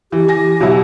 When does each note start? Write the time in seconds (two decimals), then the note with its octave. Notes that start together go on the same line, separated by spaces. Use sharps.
0.12 E3 G4
0.28 G#5 A#6
0.60 B2 F#3 E4